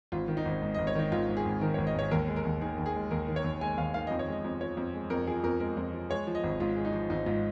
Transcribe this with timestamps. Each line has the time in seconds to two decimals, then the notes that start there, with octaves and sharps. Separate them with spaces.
0.12 G#1 F4
0.28 D#3
0.37 D#4
0.45 G#1
0.62 G#2
0.74 D#5
0.79 G#1
0.87 C#5
0.95 D#3 D#4
1.12 G#1 F4
1.28 G#2
1.37 G#4
1.45 G#1
1.61 D#3 A#4
1.74 C#5
1.78 G#1
1.87 D#5
1.95 G#2 C#5
2.11 D#2 A#4
2.28 G#3
2.36 A#4
2.45 D#2
2.61 D#3 G#4
2.78 D#2
2.86 G#4
2.95 G#3
3.11 D#2 A#4
3.28 D#3
3.36 C#5
3.44 D#2
3.61 G#3 G#5
3.77 D#2 F5
3.94 D#3 F5
4.07 F2 D#5
4.19 C#5
4.27 G#3 D#5
4.44 F2
4.61 F3 C#5
4.77 F2
4.94 G#3
5.10 F2 A#4
5.27 F3 G#4
5.43 F2 A#4
5.60 G#3 A#4
5.77 F2
5.93 F3
6.10 G#3 C#5
6.27 F3
6.35 D#5
6.43 G#1
6.60 G#2 F4
6.76 G#3
6.85 D#4
6.93 F3
7.09 G#1 D#4
7.26 G#2 F4